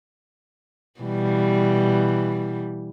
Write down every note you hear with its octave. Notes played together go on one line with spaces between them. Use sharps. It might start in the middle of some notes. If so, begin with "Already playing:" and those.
B2 E3 G3